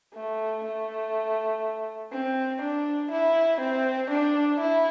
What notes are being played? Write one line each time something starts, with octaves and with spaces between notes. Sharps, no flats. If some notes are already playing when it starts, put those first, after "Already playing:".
A3
A3
C4
D4
E4
C4
D4
E4